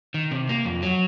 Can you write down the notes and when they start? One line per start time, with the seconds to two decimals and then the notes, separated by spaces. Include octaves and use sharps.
0.14 D#3
0.31 C3
0.49 A#3
0.65 F2
0.82 F#3